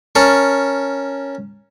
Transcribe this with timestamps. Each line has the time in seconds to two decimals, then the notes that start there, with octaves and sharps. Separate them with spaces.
0.15 C#4 A#4 A5 C#6